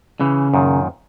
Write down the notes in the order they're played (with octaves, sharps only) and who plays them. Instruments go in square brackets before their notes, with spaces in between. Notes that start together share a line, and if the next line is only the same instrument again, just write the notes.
[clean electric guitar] C#3 [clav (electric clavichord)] E3
[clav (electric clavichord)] F#2 A#2 D#3